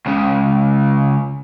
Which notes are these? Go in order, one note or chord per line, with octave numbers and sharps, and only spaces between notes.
C#2 C#3